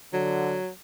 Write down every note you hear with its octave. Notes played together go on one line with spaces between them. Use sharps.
D3 F#3